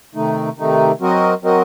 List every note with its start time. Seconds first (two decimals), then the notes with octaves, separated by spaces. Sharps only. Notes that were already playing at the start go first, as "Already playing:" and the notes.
0.15 C3 D#3 A3 D#4
0.58 C3 D#3 A3 D#4
1.00 F#3 C4 F#4 A#4 D#5
1.43 F#3 C4 F#4 A#4 D#5